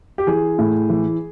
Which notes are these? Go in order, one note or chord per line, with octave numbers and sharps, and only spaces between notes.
G4
E3 G#4
A2
E3